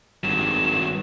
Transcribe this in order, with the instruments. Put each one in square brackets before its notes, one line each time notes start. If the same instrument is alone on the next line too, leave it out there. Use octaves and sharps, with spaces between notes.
[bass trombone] G#1 [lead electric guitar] G2 F#3 [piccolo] E7